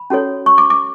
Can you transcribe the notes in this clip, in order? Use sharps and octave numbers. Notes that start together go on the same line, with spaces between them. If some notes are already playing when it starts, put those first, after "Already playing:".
Already playing: B5
C#4 F#4 A4 C#5
C#6
D6
D6